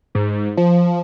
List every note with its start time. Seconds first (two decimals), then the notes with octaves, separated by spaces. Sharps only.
0.15 G#2
0.57 F3